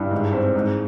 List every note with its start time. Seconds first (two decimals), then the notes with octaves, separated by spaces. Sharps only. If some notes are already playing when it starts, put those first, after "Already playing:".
Already playing: G2 D4 E4
0.11 G#2
0.33 C4
0.55 G#2